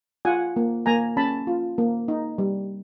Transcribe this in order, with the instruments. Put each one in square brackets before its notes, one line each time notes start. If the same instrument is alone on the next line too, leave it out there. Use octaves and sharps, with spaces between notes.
[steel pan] F4 F#5 G#5
A#3
A#3 G#5 A#5
C#4 A5 B5
F4
A#3
D#4
G3